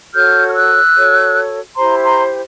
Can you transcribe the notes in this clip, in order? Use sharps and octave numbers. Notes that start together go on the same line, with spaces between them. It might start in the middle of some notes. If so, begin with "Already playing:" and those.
F#4 A4 C#5 F6 G6
F6
E6 F#6
F#4 A4 C#5
E4 G4 C5 A#5 C6
A#5 C6